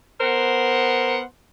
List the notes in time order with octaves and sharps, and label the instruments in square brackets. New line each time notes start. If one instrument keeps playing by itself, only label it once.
[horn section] B3 A#4 C5 F#5